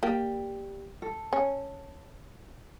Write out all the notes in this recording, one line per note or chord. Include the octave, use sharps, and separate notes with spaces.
A#3 G4 D5 G5
A4
C#4